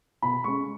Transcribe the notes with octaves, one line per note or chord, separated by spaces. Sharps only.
B2 B5
G#3 C#4 C#6